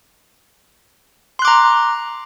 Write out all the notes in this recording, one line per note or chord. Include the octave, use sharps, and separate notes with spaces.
A#5 C6 D6 F#6